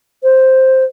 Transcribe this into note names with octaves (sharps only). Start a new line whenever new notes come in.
C5